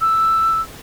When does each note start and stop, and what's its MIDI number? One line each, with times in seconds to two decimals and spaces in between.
0.01 0.61 88